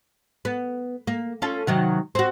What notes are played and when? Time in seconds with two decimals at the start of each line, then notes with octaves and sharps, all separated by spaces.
0.45 B3
1.07 A#3
1.42 C#4 F4 A4
1.67 C3 D#3 F#3
2.15 C4 F#4